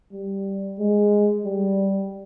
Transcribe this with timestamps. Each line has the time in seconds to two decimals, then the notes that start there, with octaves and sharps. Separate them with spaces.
0.13 G3
0.79 G#3
1.45 G3